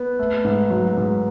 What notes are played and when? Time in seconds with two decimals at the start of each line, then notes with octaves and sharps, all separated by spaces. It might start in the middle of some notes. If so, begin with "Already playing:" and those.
Already playing: B3
0.19 A3
0.45 G#2
0.70 F#3
0.97 G#2